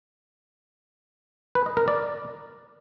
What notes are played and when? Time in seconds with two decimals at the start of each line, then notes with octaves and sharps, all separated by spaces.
1.55 B4
1.66 D#5
1.77 A#4
1.88 D5